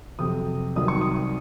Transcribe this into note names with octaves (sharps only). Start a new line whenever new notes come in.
F2 C3 F#3 D#6
C2 C3 D#3 F#3 D#6
C#6
D#6